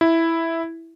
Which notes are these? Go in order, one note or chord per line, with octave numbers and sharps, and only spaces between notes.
E4